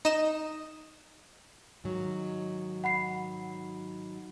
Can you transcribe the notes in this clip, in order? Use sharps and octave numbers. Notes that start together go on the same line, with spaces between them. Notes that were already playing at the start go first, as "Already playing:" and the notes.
D#4 E7
G#2 D#3 F#3
F#5 B5 C7